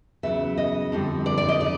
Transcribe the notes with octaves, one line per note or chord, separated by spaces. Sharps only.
E2 C#3 F#3 E5
D#5
F2 D3 G3
D5
D5
D#5
C#3 D5